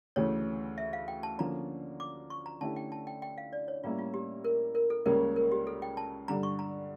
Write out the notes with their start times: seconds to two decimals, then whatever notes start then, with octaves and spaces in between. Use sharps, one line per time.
0.16 D2 C#3 E3 A3 C#5
0.78 E5
0.93 F5
1.08 G5
1.23 A5
1.39 D3 F3 A#3 C#4 A#5
2.00 D6
2.30 C#6
2.46 A#5
2.61 D3 A3 C#4 E4 G4 A5
2.76 G5
2.92 A5
3.07 G5
3.22 G5
3.38 F5
3.53 D5
3.68 C#5
3.84 A2 G3 A#3 C#4 E4 F4
3.99 F4
4.14 G4
4.44 A#4
4.75 A#4
4.90 A4
5.06 C#2 C#3 G3 A#3 C#4 A#4
5.36 A#4
5.52 G4
5.67 A4
5.82 G5
5.97 A5
6.28 G2 D3 G3 A#5
6.43 C#6
6.59 A#5